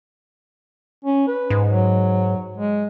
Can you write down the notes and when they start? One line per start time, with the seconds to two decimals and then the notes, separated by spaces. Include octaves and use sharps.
1.04 C#4
1.27 B4
1.50 G#2
1.68 F#3
2.57 G#3